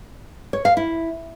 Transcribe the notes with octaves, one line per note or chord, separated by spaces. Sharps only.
C#5
F5
E4